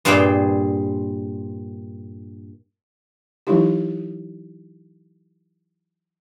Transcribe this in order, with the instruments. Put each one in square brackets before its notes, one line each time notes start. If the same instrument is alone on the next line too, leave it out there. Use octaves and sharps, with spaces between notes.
[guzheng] G2 A#2 C4 G#4 C5 G5
[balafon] E3 F#3 G#3 D#4 E4 G4